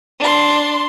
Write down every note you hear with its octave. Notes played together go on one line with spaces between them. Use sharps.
D4 C6